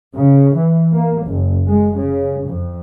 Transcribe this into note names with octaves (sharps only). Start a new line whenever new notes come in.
C#3
E3
A#3
F#1
G#3
C#3
F2